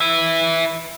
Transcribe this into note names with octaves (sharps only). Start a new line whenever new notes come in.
B4 E5